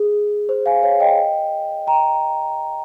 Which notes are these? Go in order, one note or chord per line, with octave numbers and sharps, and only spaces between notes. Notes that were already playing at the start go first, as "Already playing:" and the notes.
Already playing: G#4
C5
F5 G#5
C#5 F5
D#5 G5
G5 A#5